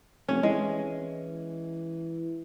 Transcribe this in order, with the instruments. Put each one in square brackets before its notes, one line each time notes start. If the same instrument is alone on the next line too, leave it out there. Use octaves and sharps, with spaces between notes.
[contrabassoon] F1 [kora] C#4
[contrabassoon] E3 [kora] G#3